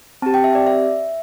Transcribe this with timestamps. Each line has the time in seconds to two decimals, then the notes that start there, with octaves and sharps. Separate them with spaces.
0.22 C4 A5
0.26 G4
0.34 G5
0.44 E5
0.55 D5
0.67 E5